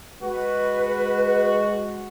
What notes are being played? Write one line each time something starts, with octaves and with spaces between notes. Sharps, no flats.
G#3 F#4 B4